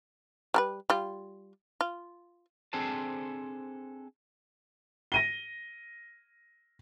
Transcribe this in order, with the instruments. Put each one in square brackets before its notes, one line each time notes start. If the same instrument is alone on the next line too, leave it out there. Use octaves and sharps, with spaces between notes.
[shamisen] G3 A#4 B4
G3 F4
F4
[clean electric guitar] C4 D4 G#4 A4 C5 A5
[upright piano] A#6 D#7 G7